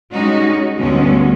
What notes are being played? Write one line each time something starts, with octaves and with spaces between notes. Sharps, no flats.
G3 G#3 C#4 D#4 F#4
D2 G2 G#3 B3 C#4